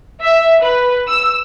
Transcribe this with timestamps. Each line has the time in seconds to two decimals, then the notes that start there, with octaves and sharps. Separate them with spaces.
0.23 E5
0.63 B4
1.07 E6